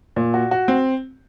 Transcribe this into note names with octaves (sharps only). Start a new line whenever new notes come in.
A#2
F#4
F#4
C4